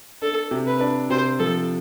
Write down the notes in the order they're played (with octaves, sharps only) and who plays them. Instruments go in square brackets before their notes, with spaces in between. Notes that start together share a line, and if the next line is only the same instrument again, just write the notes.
[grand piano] D4 [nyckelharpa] A4
[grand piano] C3
[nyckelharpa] B4
[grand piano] D4
[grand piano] C3 [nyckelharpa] C5
[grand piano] F3 [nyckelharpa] A4